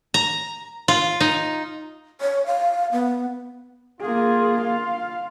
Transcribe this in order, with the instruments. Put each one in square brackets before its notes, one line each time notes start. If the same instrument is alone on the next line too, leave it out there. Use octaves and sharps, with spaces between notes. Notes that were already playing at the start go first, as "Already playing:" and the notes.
[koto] A#5
F4
D#4
[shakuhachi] C#5
F5
B3
[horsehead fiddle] A#3 G#4 [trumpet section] F4
[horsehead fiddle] F5